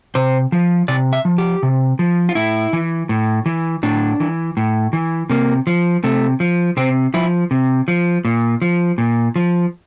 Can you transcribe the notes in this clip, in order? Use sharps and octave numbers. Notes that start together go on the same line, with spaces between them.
C3 C5
F3
C3 D5
E5
F3
G4
C3
F3
F4
A2 E4
E3
A2
E3
A2 D4
E3
A2
E3
C3 A#3
F3
C3 A3
F3
C3 C4
F3 E4
C3
F3
A#2
F3
A#2
F3